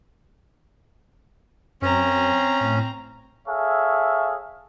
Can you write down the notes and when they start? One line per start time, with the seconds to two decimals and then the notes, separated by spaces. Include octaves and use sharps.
1.82 F#2 C4 C#4 A#5
2.61 A2
3.48 G#4 A4 C#5 E5 F5